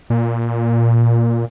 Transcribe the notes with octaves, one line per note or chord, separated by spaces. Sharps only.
A#2